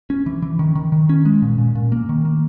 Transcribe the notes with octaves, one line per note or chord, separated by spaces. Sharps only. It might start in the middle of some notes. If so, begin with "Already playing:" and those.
C#4
E3
E3
D#3
D#3
D#3
C#4
G#3
A#2
A#2
A#2
A#3
D#3
A#3